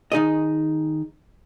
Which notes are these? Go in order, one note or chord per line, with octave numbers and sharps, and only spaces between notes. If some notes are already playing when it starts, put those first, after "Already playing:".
D#3 D#4 G#4 D#5